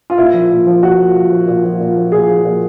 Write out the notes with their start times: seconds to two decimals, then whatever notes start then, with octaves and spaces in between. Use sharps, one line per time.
0.10 F4
0.18 A#2 E4
0.33 F3
0.51 A#2
0.66 F3
0.83 A#2 F#4
0.99 F3
1.15 A#2
1.31 F3
1.47 A#2
1.63 F3
1.80 A#2
1.96 F3
2.12 A#2 G#4
2.28 F3
2.45 A#2